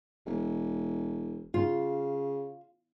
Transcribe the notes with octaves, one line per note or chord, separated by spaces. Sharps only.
E1
C#3 F4